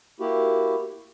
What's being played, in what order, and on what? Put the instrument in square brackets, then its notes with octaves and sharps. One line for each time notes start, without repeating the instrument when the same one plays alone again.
[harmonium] A#3 E4 F#4 G4